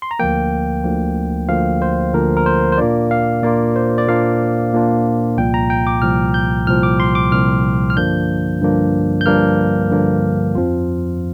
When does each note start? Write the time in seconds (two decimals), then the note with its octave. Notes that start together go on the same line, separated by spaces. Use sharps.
0.02 C6
0.11 A#5
0.19 D2 D3 F3 A#3 G5
0.84 D2 D3 F3 A#3
1.49 D2 D3 F3 A#3 F5
1.82 C5
2.13 D2 D3 F3 A#3 A#4
2.37 A#4
2.46 C5
2.72 C5
2.78 A#2 A#3 D4 F4 D5
3.11 F5
3.43 A#2 A#3 D4 F4 D5
3.76 C5
3.98 D5
4.08 A#2 A#3 D4 F4 F5
4.73 A#2 A#3 D4 F4
5.38 C2 A#2 F3 G5
5.54 A#5
5.70 G5
5.87 D6
6.02 C2 A#2 F3 F6
6.34 G6
6.67 C2 A#2 F3 F6
6.83 D6
7.00 C6
7.15 D6
7.31 C2 A#2 F3 F6
7.90 F6
7.96 G2 D3 F3 A#3 D4 G6
8.62 G2 D3 F3 A#3 D4
9.21 G6
9.26 G2 D3 F3 A#3 D4 F6
9.90 G2 D3 F3 A#3 D4
10.55 F2 F3 C4 F4